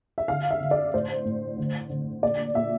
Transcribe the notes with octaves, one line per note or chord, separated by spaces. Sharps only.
E5
D3 F5
E5
D3
D5
A2 C5
A2
D3
D3
A#2 D5
A#2 E5